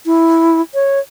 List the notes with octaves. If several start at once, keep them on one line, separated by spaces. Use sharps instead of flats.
E4
C#5